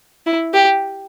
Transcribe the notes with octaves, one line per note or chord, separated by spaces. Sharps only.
E4
G4